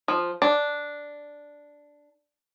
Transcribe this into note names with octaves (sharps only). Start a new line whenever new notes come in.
F3
D4